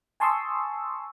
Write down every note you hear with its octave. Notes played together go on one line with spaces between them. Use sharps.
G#5 A5 C6 C#6 D#6 E6